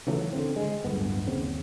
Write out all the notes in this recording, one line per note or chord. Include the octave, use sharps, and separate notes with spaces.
C#3 E3 F#3 A3
D3 C4
G#3
D1 G1 B3
D#2 C#3 C4